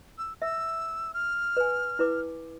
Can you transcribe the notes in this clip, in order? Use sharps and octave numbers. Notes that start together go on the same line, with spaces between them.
E6
E5 E6
F6
B4 G#5
E4 B4 D6